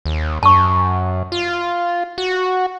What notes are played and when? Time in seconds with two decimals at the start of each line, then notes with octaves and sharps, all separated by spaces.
0.06 D#2
0.43 F#2 A5 C#6
1.32 F4
2.18 F#4